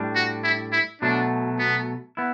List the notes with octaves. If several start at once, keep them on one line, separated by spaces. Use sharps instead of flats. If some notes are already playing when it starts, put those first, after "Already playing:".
Already playing: A2 G3 D4
F#4
E4
E4
B2 F#3 A3 D4
B3
B3 E4